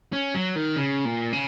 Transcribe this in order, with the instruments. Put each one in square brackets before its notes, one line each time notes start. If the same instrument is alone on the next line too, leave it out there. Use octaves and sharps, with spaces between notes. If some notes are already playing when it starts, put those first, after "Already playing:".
[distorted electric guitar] C#4
F#3
D#3
C#3
A#2
C#3